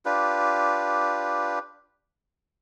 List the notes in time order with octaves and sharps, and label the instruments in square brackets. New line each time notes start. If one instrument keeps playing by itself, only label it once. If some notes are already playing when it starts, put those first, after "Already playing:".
[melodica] D4 F4 G4 B4